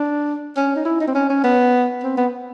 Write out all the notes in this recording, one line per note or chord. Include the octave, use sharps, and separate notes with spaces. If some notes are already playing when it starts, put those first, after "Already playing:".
Already playing: D4
C#4
D#4
E4
D#4
C4
C#4
C#4
B3
C4
B3